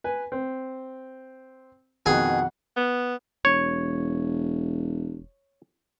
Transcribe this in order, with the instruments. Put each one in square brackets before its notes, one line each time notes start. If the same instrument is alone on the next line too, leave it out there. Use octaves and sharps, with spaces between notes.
[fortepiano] B4 G#5
C4
[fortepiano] F2 B2 D#3 [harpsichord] G#4 [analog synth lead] F#5
[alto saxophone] B3
[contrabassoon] E1 [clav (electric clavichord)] C#5